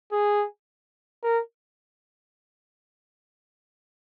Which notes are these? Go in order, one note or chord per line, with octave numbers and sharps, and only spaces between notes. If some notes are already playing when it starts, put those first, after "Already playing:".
G#4
A#4